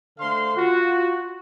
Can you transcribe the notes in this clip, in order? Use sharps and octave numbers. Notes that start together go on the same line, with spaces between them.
D3 A3 A4 C5 F5 C6
F4 F#4